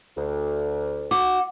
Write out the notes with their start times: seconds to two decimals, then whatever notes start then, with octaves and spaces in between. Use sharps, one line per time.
0.16 D2
1.11 F#4 D6